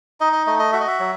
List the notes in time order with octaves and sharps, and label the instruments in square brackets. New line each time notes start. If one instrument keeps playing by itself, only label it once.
[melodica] D#4 D#5
D#5
A3 D#5
D#5
F#4 E5
D#5
E5
F#3